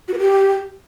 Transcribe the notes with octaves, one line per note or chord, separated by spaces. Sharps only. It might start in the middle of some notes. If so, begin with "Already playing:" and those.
F#4
B4
G4